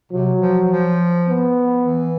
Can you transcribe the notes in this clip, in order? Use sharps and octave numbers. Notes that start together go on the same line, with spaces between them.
C3 F#3
F3
F3
B3
E3